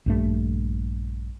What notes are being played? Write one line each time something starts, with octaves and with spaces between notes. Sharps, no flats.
A#1 G2 A3